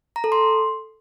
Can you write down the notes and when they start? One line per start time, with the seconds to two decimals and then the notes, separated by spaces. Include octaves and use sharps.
0.16 A#5
0.24 A4
0.32 C6